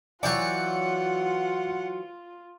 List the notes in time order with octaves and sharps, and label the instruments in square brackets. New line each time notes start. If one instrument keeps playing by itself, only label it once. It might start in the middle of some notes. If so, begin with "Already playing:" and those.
[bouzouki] E3 F#3 [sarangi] F4 [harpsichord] D5 G5 C#6 [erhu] F#5